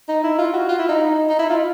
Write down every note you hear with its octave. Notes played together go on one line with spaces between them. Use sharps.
D#4
E4
F4
F#4
F4
E4
D#4
D#4
E4
F4